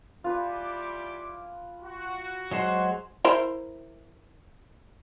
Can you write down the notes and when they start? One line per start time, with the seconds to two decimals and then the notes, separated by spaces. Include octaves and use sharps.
0.24 G3 E4 F4 B4 G#5 D6
1.82 F#4
2.52 F#3 G#3 C5
3.25 E4 A#4 C5